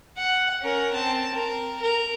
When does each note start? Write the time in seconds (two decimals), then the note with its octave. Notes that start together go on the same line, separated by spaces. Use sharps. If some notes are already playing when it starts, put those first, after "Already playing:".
0.17 F#5
0.62 C#4 A#4
0.93 C4 A5
1.35 A#4
1.82 A#4